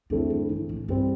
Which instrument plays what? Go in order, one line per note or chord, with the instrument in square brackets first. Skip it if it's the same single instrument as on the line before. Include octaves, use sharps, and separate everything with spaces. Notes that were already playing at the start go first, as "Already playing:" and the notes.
[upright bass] E2 [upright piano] D3 A3 C4 E4
[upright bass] G2
[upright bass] G2 [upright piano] E3
[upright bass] A2
[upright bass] G2 [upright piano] G3 C4